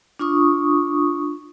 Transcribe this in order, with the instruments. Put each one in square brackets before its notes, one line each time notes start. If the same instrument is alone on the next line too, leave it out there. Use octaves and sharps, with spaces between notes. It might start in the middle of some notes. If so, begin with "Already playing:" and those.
[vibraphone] D4 F4 C#6 D#6